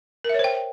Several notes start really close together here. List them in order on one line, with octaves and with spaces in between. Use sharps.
A#4 E5 C#5 C5 G5